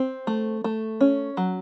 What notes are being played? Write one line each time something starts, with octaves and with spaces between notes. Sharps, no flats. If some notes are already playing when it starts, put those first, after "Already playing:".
Already playing: C4
A3
A3
C#4
F#3